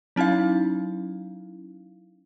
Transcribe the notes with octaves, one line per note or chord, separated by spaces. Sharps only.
F#3 C#4 D#4 E4 F5